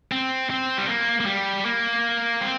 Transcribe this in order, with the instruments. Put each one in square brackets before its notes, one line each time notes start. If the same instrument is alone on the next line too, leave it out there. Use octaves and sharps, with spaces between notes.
[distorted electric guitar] C4
C4
G3
A#3
A#3
G3
A#3
C4